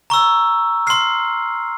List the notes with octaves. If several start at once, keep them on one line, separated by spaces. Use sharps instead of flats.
A#5 C#6 E6
C6 F6 C7